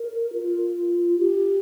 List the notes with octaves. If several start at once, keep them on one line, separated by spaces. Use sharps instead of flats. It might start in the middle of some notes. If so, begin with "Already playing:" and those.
Already playing: A#4
F4
G4